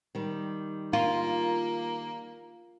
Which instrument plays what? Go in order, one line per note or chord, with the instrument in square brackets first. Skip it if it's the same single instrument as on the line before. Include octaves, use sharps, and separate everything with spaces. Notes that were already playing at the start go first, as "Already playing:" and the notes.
[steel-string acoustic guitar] D#3 G3
[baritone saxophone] A#3 [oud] F4